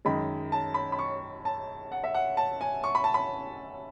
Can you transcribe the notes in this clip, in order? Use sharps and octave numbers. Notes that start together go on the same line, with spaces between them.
F#2 D#3 G#3 D#4 B5
A5
B5
B5
C#6
A5
F#5
E5
F#5
A5
G#5
C#6
B5
A5
B5